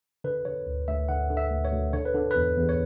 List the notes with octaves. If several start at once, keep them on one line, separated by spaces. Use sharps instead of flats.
D3 B4
D3 C#5
D2
D2 E5
D3 F#5
D3
E5
D2
C#5
D2
D3 C#5
B4
D3
E2 B4
E2
C#5